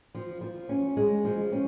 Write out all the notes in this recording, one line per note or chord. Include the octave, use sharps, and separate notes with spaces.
F3
F3
C#4
G#3
F3
C#4